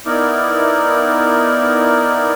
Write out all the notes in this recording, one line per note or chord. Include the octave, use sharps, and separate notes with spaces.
B3 D#4 E4 A#4 D5